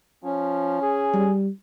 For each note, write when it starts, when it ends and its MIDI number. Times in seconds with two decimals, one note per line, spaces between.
0.24 0.79 53
0.24 1.26 61
0.82 1.32 68
1.14 1.49 55